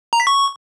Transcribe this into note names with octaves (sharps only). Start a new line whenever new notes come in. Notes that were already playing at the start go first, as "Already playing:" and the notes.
A#5
B6
C#6